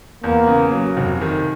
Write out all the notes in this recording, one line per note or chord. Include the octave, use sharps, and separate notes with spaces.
E2 A#3
C#3
F#3
F1
D#3